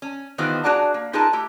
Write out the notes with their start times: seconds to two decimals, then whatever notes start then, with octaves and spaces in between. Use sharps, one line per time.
0.02 C#4
0.38 D#3 E3 B3 F4 G4 C5
0.63 D4 F#4 G#4 D5 A5 A#5
0.94 A#3
1.13 D#4 F4 G#4 A#4 B4 A5
1.33 A3 E4 G4